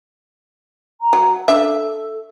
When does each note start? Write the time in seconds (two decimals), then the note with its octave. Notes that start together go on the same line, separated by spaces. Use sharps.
1.01 A#5
1.13 F#3
1.48 D4 A4 E5